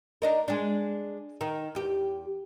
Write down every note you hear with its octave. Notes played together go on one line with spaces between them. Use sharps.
D4 D#4 A#4
G#3 D4
D#3
E2 G4